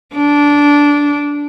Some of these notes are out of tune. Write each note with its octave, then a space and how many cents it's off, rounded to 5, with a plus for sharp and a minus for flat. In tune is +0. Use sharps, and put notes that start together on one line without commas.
D4 -15